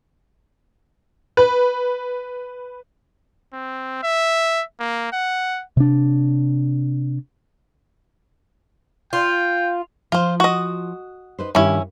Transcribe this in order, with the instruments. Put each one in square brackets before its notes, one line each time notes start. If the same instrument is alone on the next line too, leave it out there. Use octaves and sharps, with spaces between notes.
[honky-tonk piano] B4
[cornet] C4
E5
A#3
F#5
[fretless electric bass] C3 D4
[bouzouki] F4 [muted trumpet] G5
[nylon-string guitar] F3 [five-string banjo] F4 C5
[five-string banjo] F#4 D#5
[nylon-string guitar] D#4 B4 C5
[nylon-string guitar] G2 D#3 G4 [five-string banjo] C#4 E4